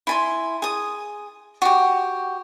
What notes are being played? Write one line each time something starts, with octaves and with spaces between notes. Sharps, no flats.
E4 G#5 C6
G#4 D#6
F#4 G4